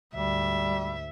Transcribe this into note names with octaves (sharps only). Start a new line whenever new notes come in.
D2 G#2 G3 E5